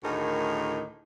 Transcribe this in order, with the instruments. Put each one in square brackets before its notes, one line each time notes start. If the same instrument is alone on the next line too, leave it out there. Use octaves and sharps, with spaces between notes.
[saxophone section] D2 A2 D#3 G#4 A#4